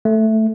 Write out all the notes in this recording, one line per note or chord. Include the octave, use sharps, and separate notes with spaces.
A3